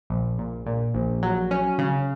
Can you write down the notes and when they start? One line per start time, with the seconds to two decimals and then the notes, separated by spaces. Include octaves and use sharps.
0.10 A#1
0.38 A#2
0.66 A#2
0.94 A#1
1.23 F#3
1.51 C#4
1.78 C#3